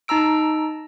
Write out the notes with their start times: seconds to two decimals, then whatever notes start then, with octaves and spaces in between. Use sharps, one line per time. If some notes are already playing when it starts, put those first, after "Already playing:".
0.08 D#4 A5 A#5 E6 D7